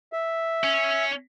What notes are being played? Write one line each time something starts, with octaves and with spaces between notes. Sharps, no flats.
E5
C#4